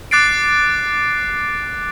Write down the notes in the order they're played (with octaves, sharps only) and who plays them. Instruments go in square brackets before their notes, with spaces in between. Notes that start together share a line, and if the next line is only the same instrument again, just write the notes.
[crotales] D6 F#6 A6 C7 D7